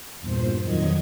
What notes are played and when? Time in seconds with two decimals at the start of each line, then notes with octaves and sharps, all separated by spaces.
0.20 E2 G2 A#2 C5
0.62 F2 A#2 D#3 F#3 D#5 G#6